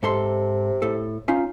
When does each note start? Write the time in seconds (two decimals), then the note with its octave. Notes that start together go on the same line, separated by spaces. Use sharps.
0.03 G#2 C3 A4 C6
0.82 A2 A4
1.28 C#4 D#4 F4